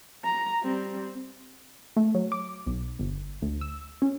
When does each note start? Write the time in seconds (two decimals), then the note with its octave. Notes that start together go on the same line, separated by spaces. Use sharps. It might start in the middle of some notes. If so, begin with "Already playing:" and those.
0.24 A#5
0.63 G3 C4
1.97 A3
2.15 F#3
2.32 D6
2.66 B1
2.99 G1
3.42 D2
3.61 E6
4.02 C#4